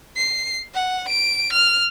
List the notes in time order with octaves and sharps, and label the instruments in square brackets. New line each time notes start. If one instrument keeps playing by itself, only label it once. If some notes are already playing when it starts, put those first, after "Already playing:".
[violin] C7
F#5
D7
F6